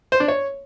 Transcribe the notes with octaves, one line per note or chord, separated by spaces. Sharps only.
C5
D4
C#5